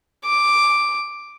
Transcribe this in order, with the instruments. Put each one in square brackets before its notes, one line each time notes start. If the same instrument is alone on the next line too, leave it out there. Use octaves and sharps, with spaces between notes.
[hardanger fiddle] D6